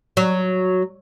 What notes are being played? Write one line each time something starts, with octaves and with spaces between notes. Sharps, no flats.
F#3